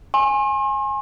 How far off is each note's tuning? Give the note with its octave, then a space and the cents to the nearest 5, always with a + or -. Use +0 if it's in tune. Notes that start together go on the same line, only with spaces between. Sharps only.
G#5 +0 C6 +45